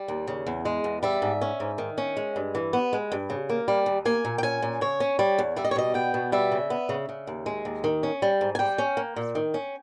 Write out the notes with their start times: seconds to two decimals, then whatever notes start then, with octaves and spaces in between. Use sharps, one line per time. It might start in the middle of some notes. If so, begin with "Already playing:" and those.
Already playing: G3
0.08 D#2
0.27 C#3
0.47 E2
0.65 G#3
0.84 E2
1.03 G3 E5
1.22 G#2
1.41 C#4
1.60 G#2
1.78 D#3
1.98 C#4
2.17 G#3
2.36 G2
2.55 E3
2.73 B3
2.93 G#3
3.12 G2
3.30 C#3
3.50 A#3
3.68 G3
3.86 D#2
4.05 A#3 G#5
4.25 A#2
4.38 G5
4.43 C#4 G#5
4.62 A#2
4.81 C#3 C#5
5.00 C#4
5.19 G3
5.38 E2
5.56 G3 E5
5.64 D#5
5.71 C#5
5.76 B2 D#5
5.94 B3 G5
6.14 B2
6.32 G3 E5
6.52 C#3
6.70 B3
6.89 C#3
7.09 C#3
7.27 D#2
7.46 G#3
7.65 D#2
7.84 D#3
8.03 C#4
8.22 G3
8.41 G#2
8.55 G#5
8.59 G3 G5
8.78 C#4
8.97 A#3
9.16 A#2
9.35 D#3
9.54 C#4